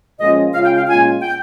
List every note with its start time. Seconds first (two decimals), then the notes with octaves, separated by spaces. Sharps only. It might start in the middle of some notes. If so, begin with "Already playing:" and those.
0.20 A#2 F3 G#3 C#4 F4 D#5
0.54 C#3 G#3 C#4 F4 F5
0.65 G5
0.76 F5
0.88 A#2 G#3 C#4 F4 G#5
1.22 G5